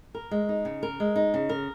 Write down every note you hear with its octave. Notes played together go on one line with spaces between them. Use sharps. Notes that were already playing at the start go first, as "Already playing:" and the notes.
A#4
G#3
D#4
C#3
A#4
G#3
D#4
C#3
A#4